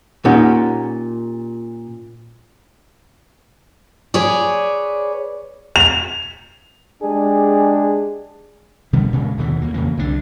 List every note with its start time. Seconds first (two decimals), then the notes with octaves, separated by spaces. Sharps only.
0.25 A#2 C#4 D#4 G4 F#5
4.14 G#4 B4 C#5 D5
5.76 F7
7.03 G#3 D4 G4 G#4
8.93 B2 D3 G3 B3
9.12 G2 A#2 C#3 G#3
9.37 D#2 B2 D3 E3
9.61 D2 A#3
9.74 F2 C#3 E3 A#3
9.97 C2 D3 D#3 D4